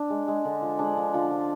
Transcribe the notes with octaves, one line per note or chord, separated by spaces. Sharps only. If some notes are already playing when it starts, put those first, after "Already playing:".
Already playing: D4
G#3
G#3
D3
F3
G#3 D4
F3
D3 F4
F3